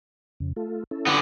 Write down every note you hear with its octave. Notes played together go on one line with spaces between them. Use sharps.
F2 C#3
A3 F4 A4
C#4 E4 A4
D3 B3